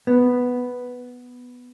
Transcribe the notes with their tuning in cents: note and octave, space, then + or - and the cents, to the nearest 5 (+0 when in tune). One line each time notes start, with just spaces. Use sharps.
B3 +0